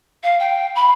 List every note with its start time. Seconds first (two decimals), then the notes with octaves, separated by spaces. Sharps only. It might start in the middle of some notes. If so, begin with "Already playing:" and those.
0.23 F5
0.39 G5
0.75 B5